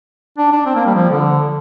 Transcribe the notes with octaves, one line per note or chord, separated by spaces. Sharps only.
D4
D4
C4
A#3
G3
F3
D3